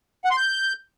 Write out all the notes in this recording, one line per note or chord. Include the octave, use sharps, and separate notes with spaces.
F#5
C6
G6